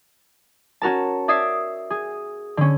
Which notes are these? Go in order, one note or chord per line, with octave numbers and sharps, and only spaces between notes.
C#4 F#4 A#4 A5
D5 E5 D#6 G#6 C7
G#4
D3 C#4